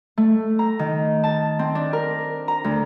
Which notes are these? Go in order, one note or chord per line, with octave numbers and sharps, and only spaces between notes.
A3
A#5
D#3
A5
C4
D4
A#4
A#5
D2